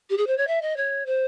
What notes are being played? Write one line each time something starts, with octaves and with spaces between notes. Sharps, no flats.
G4
G#4
C5
C#5
E5
D#5
C#5
C5